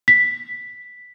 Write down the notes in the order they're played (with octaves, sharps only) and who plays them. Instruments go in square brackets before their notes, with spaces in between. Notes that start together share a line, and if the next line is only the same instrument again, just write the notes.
[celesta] B6